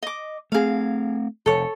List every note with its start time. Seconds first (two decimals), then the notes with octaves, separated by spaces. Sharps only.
0.03 D#5 D6
0.52 A3 C4 G#4 F5
1.46 F1 A4 C#5